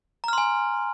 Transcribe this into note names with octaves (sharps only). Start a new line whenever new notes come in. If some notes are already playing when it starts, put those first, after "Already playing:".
G#5 A#5 C6 F6